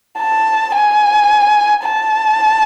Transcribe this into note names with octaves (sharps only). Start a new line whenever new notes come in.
A5
G#5
A5